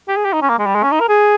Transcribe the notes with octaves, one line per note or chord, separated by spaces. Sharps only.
G4
G#4
G4
D#4
C#4
A#3
G#3
G3
G#3
C#4
D#4
A#4
G#4